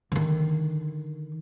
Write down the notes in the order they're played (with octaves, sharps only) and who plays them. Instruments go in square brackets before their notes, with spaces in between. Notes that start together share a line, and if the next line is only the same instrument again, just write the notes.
[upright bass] D3 D#3